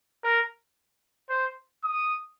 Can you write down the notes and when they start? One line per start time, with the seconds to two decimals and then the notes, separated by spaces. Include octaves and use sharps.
0.24 A#4
1.29 C5
1.84 D#6